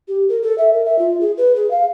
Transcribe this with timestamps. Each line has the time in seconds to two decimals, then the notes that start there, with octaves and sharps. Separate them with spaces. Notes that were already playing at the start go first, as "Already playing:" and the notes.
0.08 G4
0.29 A#4
0.43 A4
0.58 E5
0.73 A#4
0.85 E5
0.99 F4
1.21 G#4
1.38 B4
1.56 G#4
1.71 F5